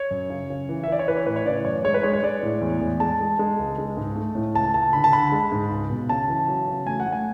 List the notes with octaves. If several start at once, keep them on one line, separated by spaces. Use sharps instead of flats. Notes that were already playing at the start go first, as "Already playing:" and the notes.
Already playing: C#5
F#2
C#3
C#3
E3
E5
E3 D5
C#5
E3 B4
C#5
A2 B4
C#5
C#3 D5
F#2 C#5
G#3 C#5
B4
G#3 C#5
C#5
G#3 D5
A2
E2
E2
G#3 A5
G#3
G#3
C#2
G#3
G#2
A3
A2
C#2 A5
C#2 A5
D3 B5
A5
D3 B5
G#3
G#2
C#2
B2
C#3 A5
E3
F#3
C#3
A3 G#5
F#5
A3
G#5